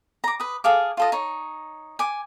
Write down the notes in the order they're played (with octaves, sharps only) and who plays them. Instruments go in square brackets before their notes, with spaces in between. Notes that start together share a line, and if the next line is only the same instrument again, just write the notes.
[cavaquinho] A#5 D6
B4 D#6
G#4 A4 F5 D6
F4 A4 D#5
D#4 C#5
G#5 D6